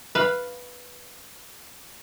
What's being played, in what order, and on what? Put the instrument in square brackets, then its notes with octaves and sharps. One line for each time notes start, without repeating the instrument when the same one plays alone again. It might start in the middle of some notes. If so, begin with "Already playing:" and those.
[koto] B4 F5